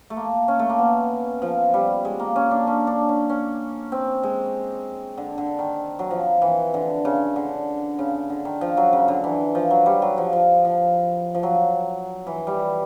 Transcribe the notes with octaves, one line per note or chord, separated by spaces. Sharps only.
A3
A#3
C#4
A3
A#3
B3
F3
G3
G#3
A#3
C#4
D4
C#4
D4
C#4
C#4
C4
G#3
D3
D3
D#3
F#3
F3
E3
D3
C#3
D3
C#3
D3
D#3
F3
F#3
C#3
D3
E3
F3
F#3
G3
F#3
F3
F3
F3
F3
F#3
E3
G3